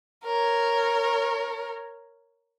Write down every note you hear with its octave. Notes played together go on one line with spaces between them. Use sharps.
A#4 C#5